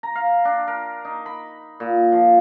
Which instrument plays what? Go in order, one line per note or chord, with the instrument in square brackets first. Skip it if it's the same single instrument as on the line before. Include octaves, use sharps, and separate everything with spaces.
[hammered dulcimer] A#5
F5
D4
A#4
D#4
B5
A#2
F3